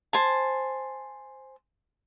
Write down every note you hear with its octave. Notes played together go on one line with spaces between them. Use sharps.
C5 G#5 A5